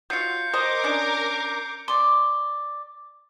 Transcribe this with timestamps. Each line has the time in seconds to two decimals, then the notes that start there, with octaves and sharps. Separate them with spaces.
0.10 F#3 F4 G6 C7 C#7
0.53 A#4 C5 D#5 D6
0.84 C#4 D4
1.88 D5 C6